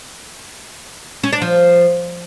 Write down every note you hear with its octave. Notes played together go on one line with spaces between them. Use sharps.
C#4
D4
F3